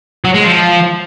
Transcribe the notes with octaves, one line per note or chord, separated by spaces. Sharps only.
F#3
G#3
F3